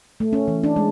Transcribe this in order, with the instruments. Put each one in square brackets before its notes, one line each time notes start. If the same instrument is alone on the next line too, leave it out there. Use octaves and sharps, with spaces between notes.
[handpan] A3
C#4
E3
D4
G#3